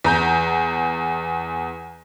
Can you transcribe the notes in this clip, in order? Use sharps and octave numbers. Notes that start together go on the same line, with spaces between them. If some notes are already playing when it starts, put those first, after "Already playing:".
E2 A#5 G6